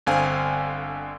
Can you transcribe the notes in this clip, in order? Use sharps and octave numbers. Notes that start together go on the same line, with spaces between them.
G1 D3 C4 F5 G#5